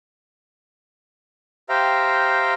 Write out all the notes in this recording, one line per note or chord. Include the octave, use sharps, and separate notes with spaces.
G4 C5 E5 F5 G5 A#5